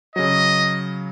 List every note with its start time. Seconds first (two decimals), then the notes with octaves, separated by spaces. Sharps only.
0.16 C#3 F#3 D#5